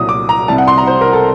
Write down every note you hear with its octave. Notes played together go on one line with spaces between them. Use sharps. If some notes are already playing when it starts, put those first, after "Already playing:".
Already playing: C2 A#2 F#3 D#6
D6
A#5
C2 C3 G3 A5
F#5
C6
A#5
C5
A#4
A4